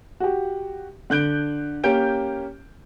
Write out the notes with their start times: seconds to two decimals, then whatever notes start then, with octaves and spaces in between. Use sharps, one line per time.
0.20 F#4 G4
1.10 D3 F#6 G6 D7 G7
1.84 A#3 C#4 G4 G6 D7